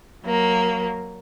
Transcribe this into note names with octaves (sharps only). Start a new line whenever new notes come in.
F#3 A#3